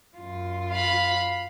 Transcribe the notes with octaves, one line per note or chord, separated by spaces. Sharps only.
F#2 F4
F5 B5